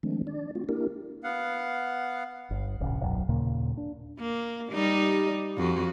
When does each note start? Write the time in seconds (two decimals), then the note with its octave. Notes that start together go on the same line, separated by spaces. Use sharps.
0.03 D#3 F3 G#3 A3 C4 D4
0.27 D4 D5
0.55 A3 C4 F4 F#4
0.69 A#3 D4 E4 G4 A#4
1.24 B3 F5 F#5
2.51 G1
2.80 D1 A#1 C#3
3.01 D#1 B1 F#2
3.29 D#2 A#2 C#3 A#3
3.77 D4
4.19 A#3
4.70 G3 D#4 G4
5.57 F2 F#4